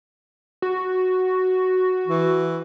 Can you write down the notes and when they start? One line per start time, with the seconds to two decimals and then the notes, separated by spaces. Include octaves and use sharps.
0.62 F#4
2.07 E3